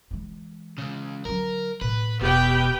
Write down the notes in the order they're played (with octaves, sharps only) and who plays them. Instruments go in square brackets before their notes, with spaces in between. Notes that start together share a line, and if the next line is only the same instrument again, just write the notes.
[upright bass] E3 G#3
[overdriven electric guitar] C#2 C#3
[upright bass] D3 F#3 [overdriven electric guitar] A#4
[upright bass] A2 [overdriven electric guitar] B4
[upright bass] E1 [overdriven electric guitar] B2 [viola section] G4 B4 G5